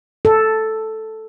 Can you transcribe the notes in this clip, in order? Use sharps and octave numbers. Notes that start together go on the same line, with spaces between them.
A4